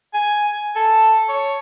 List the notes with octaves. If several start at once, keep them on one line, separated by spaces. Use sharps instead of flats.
G#5
A4
C#5